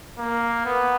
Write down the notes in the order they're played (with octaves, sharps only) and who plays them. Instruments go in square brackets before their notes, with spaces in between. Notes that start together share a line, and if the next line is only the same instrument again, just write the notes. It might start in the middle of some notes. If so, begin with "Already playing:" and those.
[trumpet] A#3
B3